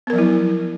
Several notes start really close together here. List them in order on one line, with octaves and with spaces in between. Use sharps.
B3 A#4 F3 F#3 E4